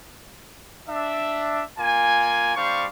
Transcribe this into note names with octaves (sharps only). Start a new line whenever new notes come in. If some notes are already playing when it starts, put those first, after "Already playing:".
D4 E5
A#3 F4 G#5
G3 D4 C5 F5 C#6